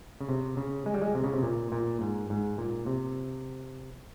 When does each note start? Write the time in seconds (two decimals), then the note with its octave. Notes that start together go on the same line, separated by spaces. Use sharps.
0.21 C#3
0.29 C3
0.57 C#3
0.86 G#3
0.94 G3
1.02 G#3
1.15 C3
1.24 C#3
1.34 C3
1.43 A#2
1.72 A#2
2.01 G#2
2.30 G#2
2.58 A#2
2.86 C3